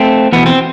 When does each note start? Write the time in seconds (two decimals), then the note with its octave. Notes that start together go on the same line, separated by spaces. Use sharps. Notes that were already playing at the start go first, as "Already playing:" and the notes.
Already playing: A3 C4
0.32 E2 B2 B3
0.46 C4